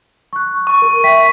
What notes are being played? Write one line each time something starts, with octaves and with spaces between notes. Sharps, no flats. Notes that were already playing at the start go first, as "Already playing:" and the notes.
C#6 F#6
C#6
A#4
E5 G5 B6